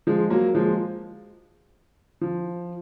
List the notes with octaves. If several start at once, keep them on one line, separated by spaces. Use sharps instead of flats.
F3 G#3
F#3 A#3
F3 G#3
F3